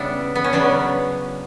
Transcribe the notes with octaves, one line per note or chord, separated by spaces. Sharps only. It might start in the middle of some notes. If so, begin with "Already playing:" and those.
Already playing: C#3 G3 B3 D4 E4
B3
C#4
C#3 F#3 B3 D4